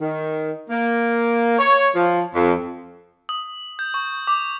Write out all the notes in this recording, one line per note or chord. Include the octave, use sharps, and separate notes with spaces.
D#3
A#3
C#5
F3
F2
D#6
G6
C#6
D6